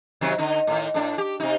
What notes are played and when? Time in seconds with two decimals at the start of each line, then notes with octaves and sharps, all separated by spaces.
0.21 C3 D#3 F#3
0.38 D3 D#4
0.67 A2 D#3
0.94 A2 D4
1.18 G4
1.40 C3 D#4